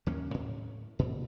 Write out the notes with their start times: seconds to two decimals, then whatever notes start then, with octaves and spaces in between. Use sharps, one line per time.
0.06 D#2 F#3 A#3 C#4
0.34 A2
0.99 A#2